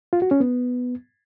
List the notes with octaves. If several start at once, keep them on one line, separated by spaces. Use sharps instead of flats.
F4
F#4
C#4
B3